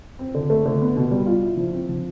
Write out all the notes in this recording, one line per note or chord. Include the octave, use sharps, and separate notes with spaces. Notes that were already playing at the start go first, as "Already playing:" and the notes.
C4
D3
A3
D3
B3
B2
G3
F4
E4
F3
C4
F3